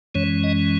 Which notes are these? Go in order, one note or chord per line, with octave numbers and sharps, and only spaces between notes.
F#2 E3 G#3 C#4 C#5
D#5